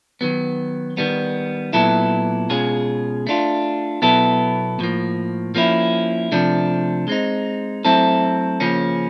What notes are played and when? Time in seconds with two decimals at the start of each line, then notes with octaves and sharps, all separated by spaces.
0.21 D#3 F#3 B3
0.97 D#3 G3 B3
1.73 A#2 F#3 B3 E4 A4
2.50 B2 G#3 C#4 F4 G#4
3.27 A3 D4 F4
4.02 B2 F#3 B3 E4 A4
4.79 A2 F3 A#3
5.55 F3 A#3 C#4 E4
6.32 C3 F3 A3 D4
7.08 G#3 C4 D#4
7.85 F#3 A3 C4 E4 A4
8.60 C#3 F3 A#3 C#4